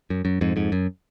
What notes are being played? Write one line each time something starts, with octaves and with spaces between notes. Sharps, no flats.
F#2
F#2
F2 G#2
F2 G#2
F#2